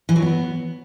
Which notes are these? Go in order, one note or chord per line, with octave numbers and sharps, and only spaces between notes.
E3
F#3
B3